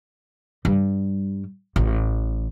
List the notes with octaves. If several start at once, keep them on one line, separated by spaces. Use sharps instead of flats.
G2 G3
A1